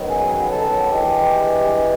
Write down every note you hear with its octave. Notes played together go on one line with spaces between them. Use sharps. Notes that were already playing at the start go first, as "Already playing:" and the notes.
Already playing: F#2 D#3 F#3 B3
G#4
A4
G2 E3 G#3 G4